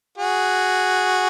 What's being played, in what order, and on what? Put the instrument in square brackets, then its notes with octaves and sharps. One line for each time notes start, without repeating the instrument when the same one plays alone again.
[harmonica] F#4 G#4